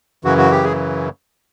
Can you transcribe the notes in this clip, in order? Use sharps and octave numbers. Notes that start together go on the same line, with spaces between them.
F#2 C#3 E3 F#4
F#4
G4
G#4